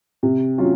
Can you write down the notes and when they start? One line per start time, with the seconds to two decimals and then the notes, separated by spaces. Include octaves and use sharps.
0.23 C3
0.58 F#3 C#4 F4